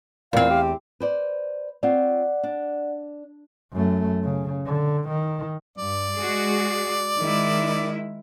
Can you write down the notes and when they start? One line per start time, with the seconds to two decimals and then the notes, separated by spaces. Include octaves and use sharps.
0.33 E2 A#2 C4 F5
0.50 G4
1.00 B4 C5 D5
1.83 C4 F4 C#5 D5 F#5
2.43 D4
3.72 F#2 A3
4.24 C#3
4.66 D3
5.08 D#3
5.77 G2 D5
6.18 G#3 F#4 G#4
7.19 D#3 G#3 E4